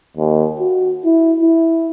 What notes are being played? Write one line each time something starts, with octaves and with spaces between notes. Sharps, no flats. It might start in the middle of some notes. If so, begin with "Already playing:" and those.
D#2
F#4
E4
E4